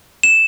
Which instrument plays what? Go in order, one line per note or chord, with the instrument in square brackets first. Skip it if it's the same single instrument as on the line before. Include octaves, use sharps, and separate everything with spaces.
[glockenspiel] E7